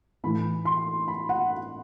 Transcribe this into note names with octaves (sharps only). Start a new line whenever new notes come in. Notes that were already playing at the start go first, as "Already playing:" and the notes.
A2 E3 B5
C6
B5
F#5